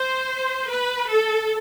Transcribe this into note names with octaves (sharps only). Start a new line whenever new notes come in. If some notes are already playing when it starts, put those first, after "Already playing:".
Already playing: C5
B4
A4